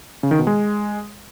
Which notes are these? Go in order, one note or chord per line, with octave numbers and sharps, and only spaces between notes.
C#3
D#3
B2
G#3